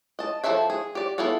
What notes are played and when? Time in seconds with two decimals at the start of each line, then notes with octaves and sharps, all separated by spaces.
0.19 D#5 A5
0.44 F3 A4 C5 E5 G5
0.70 G#4
0.95 G4 D5
1.18 B3 E4 F4 G#4 A4